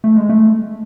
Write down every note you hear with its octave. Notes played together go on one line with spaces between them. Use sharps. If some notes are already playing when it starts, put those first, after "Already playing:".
A3
G#3
A3